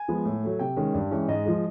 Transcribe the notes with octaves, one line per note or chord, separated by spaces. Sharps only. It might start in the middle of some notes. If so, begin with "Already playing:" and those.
Already playing: G#5
F3 G#3 B3
A2
F#3 A3
C3 G5
D#3 G#3 C#4
G2
E3 G#3 C#4
G#2 D#5
F3 G#3